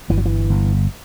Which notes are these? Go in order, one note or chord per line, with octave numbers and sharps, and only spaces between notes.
G1 E3
F#3
E3
G1